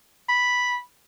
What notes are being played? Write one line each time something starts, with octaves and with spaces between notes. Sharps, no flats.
B5